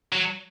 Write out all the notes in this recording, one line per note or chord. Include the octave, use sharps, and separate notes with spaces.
F#3